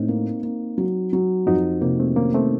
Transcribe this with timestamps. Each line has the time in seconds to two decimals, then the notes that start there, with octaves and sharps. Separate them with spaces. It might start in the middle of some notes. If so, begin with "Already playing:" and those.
Already playing: A2 C4 D#4
0.08 A#3
0.43 A#3
0.78 F#3
1.13 F#3
1.47 F2 D#4 F#4
1.81 C3 A#3
2.00 A3 C4
2.16 D#3 A#3 C#4
2.34 A3 C4